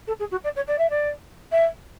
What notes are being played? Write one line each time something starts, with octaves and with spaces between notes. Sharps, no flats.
A4
G#4
F#4
D5
C#5
D5
E5
D5
E5